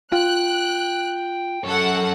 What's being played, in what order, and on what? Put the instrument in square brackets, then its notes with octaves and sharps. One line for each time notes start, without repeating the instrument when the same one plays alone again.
[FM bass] F4 [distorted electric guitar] G5 [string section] F#6
[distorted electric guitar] F#2 C#5 [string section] A4 F#5